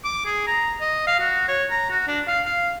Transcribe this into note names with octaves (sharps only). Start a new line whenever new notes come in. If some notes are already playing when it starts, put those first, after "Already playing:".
D6
G#4
A#5
D#5
F5
F#4
C#5
A#5
F#4
D4
F5
F5